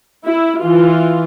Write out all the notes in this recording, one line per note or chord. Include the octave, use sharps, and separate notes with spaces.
E4
E3 F4